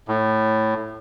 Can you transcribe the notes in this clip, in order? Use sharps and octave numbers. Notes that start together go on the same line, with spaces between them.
A2